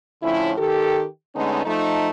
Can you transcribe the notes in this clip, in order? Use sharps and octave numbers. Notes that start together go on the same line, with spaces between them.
A2 D3 F3 C#4 E4
D#3 G4 A4
D3 G#3 A3 B3 C#4 D#4
F3 A3 D#4